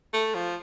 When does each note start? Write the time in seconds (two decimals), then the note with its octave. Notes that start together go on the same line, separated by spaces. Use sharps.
0.14 A3
0.35 F3